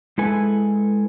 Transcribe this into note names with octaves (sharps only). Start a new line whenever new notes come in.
G#3 E4 A4 B4 G#5